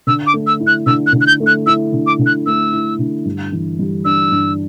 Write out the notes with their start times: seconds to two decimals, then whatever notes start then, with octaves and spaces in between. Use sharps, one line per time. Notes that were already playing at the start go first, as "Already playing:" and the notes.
0.07 D3 E6
0.27 D6
0.34 A3
0.47 E6
0.60 E4
0.67 F#6
0.86 D3 E6
1.07 F#6
1.13 D3
1.21 F#6
1.27 G6
1.40 A3
1.47 F#6
1.66 E4 E6
1.93 D3
2.07 D6
2.19 D3
2.26 F#6
2.46 A3 E6
2.73 E4
2.99 D3
3.25 G2
3.52 E3
3.79 G3
4.05 D4 E6
4.32 G2